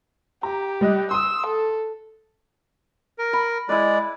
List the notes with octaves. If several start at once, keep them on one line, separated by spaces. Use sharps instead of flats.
G4 A#5
G3 D#5 F#6
C6 D#6 E6
A4
A#4
B5
G#3 E4 B4 D5